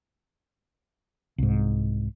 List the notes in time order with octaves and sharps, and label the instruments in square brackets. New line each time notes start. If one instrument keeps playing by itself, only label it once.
[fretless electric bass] C2 G#2